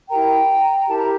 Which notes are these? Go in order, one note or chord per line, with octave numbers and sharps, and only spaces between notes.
E4 G4 A#4 G5 A#5
E4 G4 A#4 A5
A#5